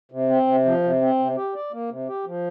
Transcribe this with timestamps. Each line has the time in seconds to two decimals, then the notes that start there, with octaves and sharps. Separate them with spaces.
0.12 C3
0.29 C4
0.47 C3
0.65 F3
0.84 C3
1.01 C4
1.19 C3
1.37 G4
1.55 D5
1.72 A#3
1.90 C3
2.08 G4
2.26 F3